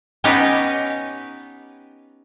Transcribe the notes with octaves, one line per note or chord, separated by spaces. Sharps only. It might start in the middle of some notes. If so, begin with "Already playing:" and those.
B3 C#4 D#4 G4 B4